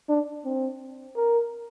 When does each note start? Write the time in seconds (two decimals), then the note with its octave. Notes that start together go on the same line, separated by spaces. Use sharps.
0.09 D4
0.45 C4
1.17 A#4